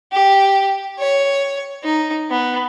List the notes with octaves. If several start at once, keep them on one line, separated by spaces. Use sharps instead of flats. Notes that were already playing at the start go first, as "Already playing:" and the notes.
G4
C#5
D#4
B3